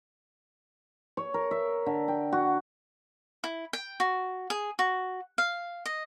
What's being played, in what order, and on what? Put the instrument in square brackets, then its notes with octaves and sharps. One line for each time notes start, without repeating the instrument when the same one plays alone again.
[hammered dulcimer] C#5
A#4
E5
D3
G5
F#4
[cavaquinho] E4
G5
F#4
G#4
F#4
F5
D#5